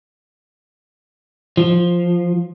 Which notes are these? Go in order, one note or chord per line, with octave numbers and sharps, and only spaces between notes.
F3